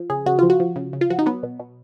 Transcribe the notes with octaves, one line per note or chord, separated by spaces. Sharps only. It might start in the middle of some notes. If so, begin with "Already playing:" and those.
Already playing: F3
C#3 G#4
C#3 F#4
F3 F4
F#4
F3
C#3
C#3
F4
F3 F#4
D#4
F#3 B3
B2
B2